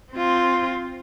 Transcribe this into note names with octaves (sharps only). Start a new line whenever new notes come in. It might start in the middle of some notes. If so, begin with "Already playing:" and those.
C4 F4